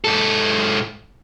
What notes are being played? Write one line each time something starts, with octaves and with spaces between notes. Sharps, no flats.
G#2 A4